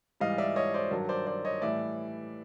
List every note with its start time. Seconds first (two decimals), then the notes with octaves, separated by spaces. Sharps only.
0.20 G#2 E3 G3 D#5 F5
0.38 D5 E5
0.56 C#5 D#5
0.74 C5 D5
0.91 G2 D#3 F#3
1.09 C5 D5
1.27 C5 D5
1.45 C#5 D#5
1.62 A2 E3 G3 D5 E5